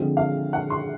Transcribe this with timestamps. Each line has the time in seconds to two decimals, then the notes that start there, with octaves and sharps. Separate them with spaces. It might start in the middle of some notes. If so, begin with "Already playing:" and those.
Already playing: D3 F3 G#3 C4 F4
0.17 F5
0.53 F#5
0.70 C6